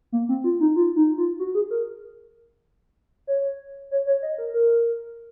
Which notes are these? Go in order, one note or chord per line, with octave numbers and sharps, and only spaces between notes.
A#3
C4
F4
D#4
F4
D#4
F4
F#4
G#4
A#4
C#5
C#5
C#5
D#5
A#4
A#4